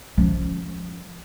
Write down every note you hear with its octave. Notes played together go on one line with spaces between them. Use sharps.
F3 C#4